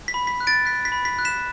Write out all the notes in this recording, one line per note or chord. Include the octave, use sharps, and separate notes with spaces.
B6
B5
B6
F#6
A6 D7
F#6 B6
B6
B5
B6
F#6
B6 E7